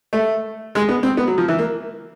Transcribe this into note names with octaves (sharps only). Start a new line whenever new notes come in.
A3
G#3
B3
C4
B3
F#3
F3
E3
A#3